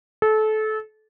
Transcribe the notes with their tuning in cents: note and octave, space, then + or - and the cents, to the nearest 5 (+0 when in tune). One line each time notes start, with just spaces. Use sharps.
A4 -25